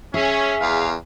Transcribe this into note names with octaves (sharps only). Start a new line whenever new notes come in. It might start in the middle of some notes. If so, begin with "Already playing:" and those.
C#4 G#4 E5
E2 F5